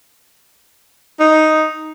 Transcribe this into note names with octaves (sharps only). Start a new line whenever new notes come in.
D#4